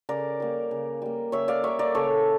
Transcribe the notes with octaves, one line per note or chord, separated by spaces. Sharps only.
C#3 A#4 D5
G3 A#3
C#3
G3 A#3
C#3 C#5 E5
D5 F5
G3 A#3 C#5 E5
A#4 D5
C#3 A4 C#5